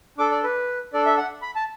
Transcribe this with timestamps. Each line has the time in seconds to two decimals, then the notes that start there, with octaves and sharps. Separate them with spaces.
0.18 D4 A4 D6
0.31 D5
0.44 B4
0.93 D4 A4 D5
1.06 E5
1.18 F#5
1.42 B5
1.56 A5